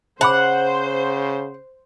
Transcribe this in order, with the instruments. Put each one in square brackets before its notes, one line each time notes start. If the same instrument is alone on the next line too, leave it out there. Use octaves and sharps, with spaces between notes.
[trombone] C#3 [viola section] C5 [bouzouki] F#5 [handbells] A5 B5 D6